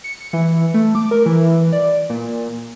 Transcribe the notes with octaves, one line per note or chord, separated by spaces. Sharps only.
C#7
E3
A3
D6
A#4
E3
D5
A#2